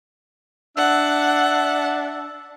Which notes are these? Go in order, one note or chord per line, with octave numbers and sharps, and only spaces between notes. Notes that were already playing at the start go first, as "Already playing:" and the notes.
D4 E5 F#5